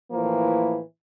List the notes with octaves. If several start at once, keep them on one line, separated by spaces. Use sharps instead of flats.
A2 E3 F3 A#3